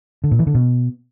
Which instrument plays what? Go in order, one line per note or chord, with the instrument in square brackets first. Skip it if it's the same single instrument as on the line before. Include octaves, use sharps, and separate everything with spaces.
[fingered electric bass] D3
A#2
E3
D3
B2